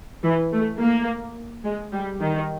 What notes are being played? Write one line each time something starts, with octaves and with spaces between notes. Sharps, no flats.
E3
A3
A#3
G#3
G3
D#3